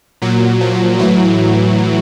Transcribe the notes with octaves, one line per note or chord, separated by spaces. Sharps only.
A#2 F#3
F3
A2 E3 F#3